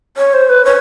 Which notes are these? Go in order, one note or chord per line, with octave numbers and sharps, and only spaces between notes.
C#5
C5
B4
C#5